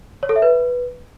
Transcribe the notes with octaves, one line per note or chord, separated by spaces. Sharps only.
C#5
A4
E5
B4